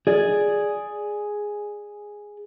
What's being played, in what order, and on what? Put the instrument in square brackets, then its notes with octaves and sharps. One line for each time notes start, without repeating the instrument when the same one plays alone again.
[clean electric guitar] G#4 D5